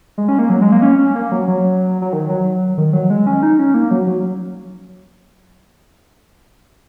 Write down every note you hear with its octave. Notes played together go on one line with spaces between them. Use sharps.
G#3
C#4
A#3
F#3
G#3
A#3
C#4
C#4
A#3
F#3
F#3
F#3
D#3
F#3
D#3
F#3
G#3
C#4
D#4
C#4
A#3
F#3
F#3